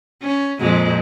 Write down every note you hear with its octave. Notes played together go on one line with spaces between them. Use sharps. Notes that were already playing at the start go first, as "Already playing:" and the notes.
C#4
F2 A#2 G#3